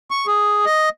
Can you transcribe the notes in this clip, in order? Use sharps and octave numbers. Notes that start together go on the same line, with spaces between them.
C#6
G#4
D#5